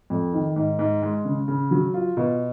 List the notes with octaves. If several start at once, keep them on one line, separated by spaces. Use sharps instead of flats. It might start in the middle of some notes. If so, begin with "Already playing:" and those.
F2
D#3
G#2
G#2
G#3
C#3
C#3
F#3
F4
B2